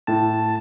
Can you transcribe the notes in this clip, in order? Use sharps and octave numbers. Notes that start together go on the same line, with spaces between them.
A2 A5